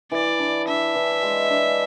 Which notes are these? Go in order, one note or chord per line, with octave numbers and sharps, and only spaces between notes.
E3 D5
D4
D4 E5
E3
G#3
D4